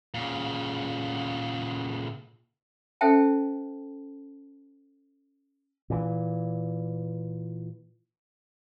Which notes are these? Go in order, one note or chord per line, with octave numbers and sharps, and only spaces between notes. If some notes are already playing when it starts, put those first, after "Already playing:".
A#2 C#3
C#4 A4 C5 E5 G5 A5
A#2 E3